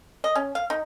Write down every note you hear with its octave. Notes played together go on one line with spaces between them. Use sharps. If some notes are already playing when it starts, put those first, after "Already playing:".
D#5
C#4
F5
D#4